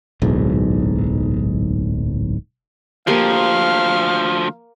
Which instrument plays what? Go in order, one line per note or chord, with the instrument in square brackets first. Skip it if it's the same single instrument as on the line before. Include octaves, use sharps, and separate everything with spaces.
[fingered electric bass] D1 B1 G#2
[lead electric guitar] D2 F3 [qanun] A#3 G4 C6 [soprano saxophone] F5